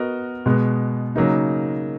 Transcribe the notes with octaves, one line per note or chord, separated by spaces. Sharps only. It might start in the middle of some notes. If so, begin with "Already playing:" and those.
Already playing: B3 F#4 A#4 D#5
B2 G#3 B3
C#3 F#3 A#3 D#4